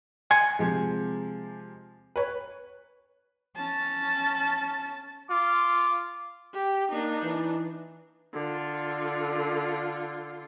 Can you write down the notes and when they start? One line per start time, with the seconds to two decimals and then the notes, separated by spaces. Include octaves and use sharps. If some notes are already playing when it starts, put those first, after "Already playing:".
0.31 F#5 G#5 C6
0.59 C3 F3 G#3
2.16 B4 C#5
3.57 C#4 A5
5.30 F4 D6
6.53 G4
6.92 A#3 D4 D#4
7.23 E3
8.34 D3 F4